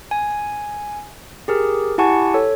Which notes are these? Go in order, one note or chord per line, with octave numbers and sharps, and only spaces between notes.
G#5
G4 G#4 A#4
E4 G4 F#5 G#5 A5 C#6
A4 C#5